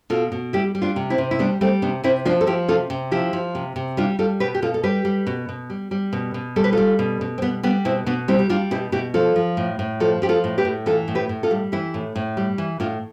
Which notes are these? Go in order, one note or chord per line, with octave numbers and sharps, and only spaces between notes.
B2 F4 A4
B2
G3 E4 G4
G3
D4 F4
C3
C4 E4
C3
E4
G3 B3 D4
G3 A3 C4
C3 B3 D4
C3 C4 E4
F3 D4 F4
A4
F3 E4 G4
C3 F4 A4
C3
F3 E4 G4
F3
C3
C3
G3 D4 F4
G3 F4 A4
B2 G4 B4
G4
B2 F4 A4
A4
G3 G4 B4
G3
B2
B2
G3
G3
B2
B2
G3 A4
B4
G3 F4 A4
B2
B2
C4
G3 B3
G3 B3 D4
B2 C4 E4
B2 B3 D4
G3 C4 E4
G4
G3 D4 F4
B2 E4 G4
B2 E4 G4
F3 F4 A4
F3
A2
A2
F3 F4 A4
F3 G4
F4 A4
A2
G4 B4
A2
E3 F4 A4
A2
G4 B4
A2
F4 A4
G3
E3 E4 G4
A2
A2
G3
E3
A2 D4 F4